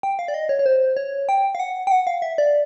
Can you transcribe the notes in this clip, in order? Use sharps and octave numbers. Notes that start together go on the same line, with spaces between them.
G5
F5
D5
D#5
C#5
C#5
C5
C#5
G5
F5
F#5
G5
F#5
F5
E5
D5